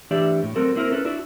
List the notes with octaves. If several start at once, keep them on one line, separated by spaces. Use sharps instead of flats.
E3 A3 D4 G4 D5 E5
A2
F#3 C4 F#4 A4 A#4
A#3 C4 E4 F4 A#4
C#4 A4 B4
D4 E4 F#4